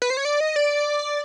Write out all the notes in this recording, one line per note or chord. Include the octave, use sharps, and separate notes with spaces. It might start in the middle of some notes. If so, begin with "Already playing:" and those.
B4
C5
C#5
D5
D#5
D5